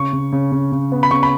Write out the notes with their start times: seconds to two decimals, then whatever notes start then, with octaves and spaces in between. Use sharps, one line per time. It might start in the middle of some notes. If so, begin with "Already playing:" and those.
Already playing: C#3 C#6
0.13 C#3
0.32 C#3
0.52 C#3
0.72 C#3
0.92 B3
1.03 B5
1.11 C#3 C#6
1.23 B5